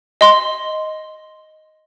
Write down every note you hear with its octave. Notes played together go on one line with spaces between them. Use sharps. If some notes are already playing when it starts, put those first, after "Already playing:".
D#5 C6